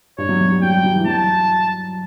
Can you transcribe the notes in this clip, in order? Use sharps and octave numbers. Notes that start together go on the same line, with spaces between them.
G2 C#5
F#3
F#3
G3
F#3 G5
G3
F#3
E3
F#3 A5